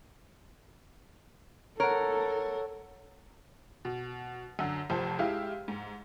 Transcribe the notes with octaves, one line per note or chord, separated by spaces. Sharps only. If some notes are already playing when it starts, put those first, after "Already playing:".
A4 A#4 C#5 F#5
B2
F#2 D3
F1 F2 C5 A5
G#3 E4 G4 F5
G#2